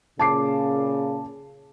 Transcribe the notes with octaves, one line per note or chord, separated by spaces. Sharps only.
A#2 C#3 A5 D6 C7